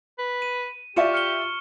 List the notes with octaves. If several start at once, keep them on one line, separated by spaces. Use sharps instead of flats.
B4
D#7
F4 G4 D5 E5 C#6 C#7 E7
F6 C#7 G7